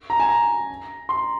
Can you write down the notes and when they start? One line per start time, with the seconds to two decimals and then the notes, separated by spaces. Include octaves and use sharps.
0.10 A#5
0.20 G#5
0.29 A#5
1.09 C6